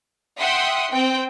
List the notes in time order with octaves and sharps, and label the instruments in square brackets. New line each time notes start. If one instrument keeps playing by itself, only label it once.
[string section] E5 F#5 G5 C6 D#6
C4 G5